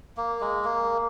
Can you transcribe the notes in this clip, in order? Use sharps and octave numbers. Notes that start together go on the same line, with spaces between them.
A#3
G#3
A#3